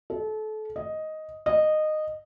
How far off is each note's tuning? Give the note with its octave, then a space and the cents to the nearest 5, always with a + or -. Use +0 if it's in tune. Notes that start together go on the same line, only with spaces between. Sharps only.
A4 -30
D#5 +5
D#5 -15